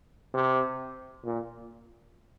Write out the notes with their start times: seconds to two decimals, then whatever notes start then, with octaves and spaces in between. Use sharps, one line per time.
0.34 C3
1.25 A#2